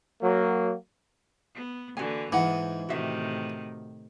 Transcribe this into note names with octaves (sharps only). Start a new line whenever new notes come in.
F#3 A#3
B3
D3 E3 A#3 F#4 G#5
G#2 E3 D#4 F#5
A2 C3 D#3 F#4 E5